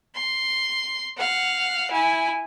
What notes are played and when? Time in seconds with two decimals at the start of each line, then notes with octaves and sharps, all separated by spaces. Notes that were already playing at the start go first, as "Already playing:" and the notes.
0.15 C6
1.17 F5 F#5
1.91 E4 G#5